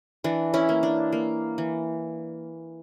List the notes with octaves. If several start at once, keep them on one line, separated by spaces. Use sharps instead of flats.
E3 D4
C#4 E4
A#3
D4
A#3
E3